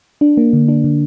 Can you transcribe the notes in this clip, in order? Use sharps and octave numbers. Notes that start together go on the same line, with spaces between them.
D4
A#3
D3
D4
D3